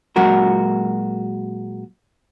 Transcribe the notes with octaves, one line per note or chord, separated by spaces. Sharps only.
A#2 F#3 G#3 F#4 A#4